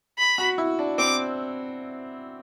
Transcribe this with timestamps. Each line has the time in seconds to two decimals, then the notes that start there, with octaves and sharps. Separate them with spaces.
0.19 B5
0.38 F#4
0.58 E4
0.79 D4
0.98 C4 D6